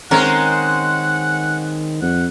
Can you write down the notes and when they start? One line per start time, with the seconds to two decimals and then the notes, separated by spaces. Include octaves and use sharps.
0.11 D#3 G#3 C4 C#4 A#4 F#5
2.02 F2 F#5